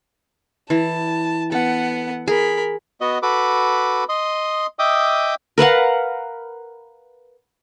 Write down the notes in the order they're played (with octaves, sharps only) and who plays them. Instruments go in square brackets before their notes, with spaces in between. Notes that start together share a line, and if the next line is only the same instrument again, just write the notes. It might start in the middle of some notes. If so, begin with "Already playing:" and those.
[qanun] E3 [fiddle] A5
[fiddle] B3 F#5 [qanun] A4
[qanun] G#4 [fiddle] A#4 B5
[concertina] B3 F#4 D#5
F#4 A4 B4 B5 D6
D#5 C6 D#6
D#5 E5 G5 D6 D#6
[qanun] A#4 B4 F5 F#5